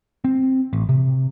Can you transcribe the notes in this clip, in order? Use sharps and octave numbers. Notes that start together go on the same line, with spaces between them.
C4
A1
C3